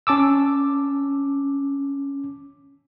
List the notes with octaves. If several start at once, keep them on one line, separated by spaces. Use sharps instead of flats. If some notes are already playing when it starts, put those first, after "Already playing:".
C#4 A5 D6 E6